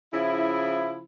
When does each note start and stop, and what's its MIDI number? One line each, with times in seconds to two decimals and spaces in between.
0.13 1.01 49
0.13 1.01 53
0.13 1.01 64